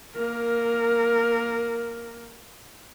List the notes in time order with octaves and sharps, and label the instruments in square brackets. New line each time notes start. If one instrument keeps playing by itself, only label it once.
[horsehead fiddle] A#3 A#4